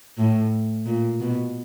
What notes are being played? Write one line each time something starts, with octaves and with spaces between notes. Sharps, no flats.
A2
A#2
B2